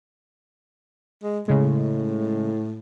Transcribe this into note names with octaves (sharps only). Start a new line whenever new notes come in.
G#3
A2 C#3 G#3